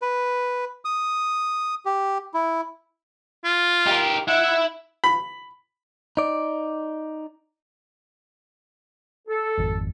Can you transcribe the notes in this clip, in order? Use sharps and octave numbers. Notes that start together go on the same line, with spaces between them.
B4
D#6
G4
E4
F4
G4 A#4
E4 E5 F#5
B5
D#4 D5
A4
G#1 F2